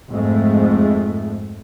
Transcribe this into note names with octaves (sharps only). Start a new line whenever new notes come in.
F2 G#2 G#3 A3